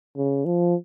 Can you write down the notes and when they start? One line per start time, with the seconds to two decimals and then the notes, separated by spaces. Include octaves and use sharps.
0.17 C#3
0.45 F3